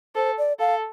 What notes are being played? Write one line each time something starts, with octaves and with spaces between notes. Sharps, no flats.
A4 C5
D5
A4 F5